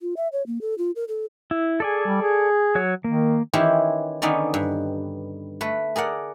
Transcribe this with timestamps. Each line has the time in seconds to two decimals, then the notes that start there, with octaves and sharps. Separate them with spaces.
0.01 F4
0.17 E5
0.33 C#5
0.47 A#3
0.61 A4
0.78 F4
0.96 A#4
1.08 A4
1.51 E4
1.80 G#4 A4 D5 G#5
2.06 G3
2.22 G#4
2.75 F#3 C#5
3.04 D#3 A#3
3.53 D#3 E3 C#4 E4 G4 C5
4.22 D3 D#3 B3 C#4 D#4 D5
4.54 G2
5.61 A3 B4
5.96 G#4 A#4 D5 F#5